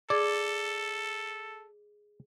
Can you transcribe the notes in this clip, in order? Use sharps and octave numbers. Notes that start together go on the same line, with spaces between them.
G#4 A4 D5